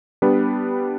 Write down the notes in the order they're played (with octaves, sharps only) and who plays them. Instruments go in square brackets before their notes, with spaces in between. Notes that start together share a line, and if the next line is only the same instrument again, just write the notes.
[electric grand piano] G3 B3 D4 G4 B4